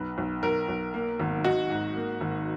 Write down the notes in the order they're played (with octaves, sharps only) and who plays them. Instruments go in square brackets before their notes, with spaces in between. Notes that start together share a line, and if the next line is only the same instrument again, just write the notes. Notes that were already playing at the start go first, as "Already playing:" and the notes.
Already playing: [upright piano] B1 B4
B1
B1 A#4
B1
A#3
G#1
D#4 F#4
G#2
A#3
G#1